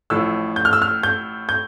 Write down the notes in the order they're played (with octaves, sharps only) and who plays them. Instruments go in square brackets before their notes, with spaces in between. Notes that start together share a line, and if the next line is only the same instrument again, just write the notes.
[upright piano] A1 A2 F3 E6
G6
F6
E6
F6
G6
G6